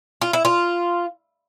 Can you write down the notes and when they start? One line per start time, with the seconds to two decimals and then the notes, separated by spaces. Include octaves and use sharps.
0.21 F4
0.33 E4
0.45 F4